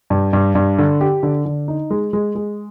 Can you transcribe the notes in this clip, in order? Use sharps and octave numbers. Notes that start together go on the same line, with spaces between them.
G2
G2
G2
D3
G4
D3
D3
D#4
G#3
G#3
G#3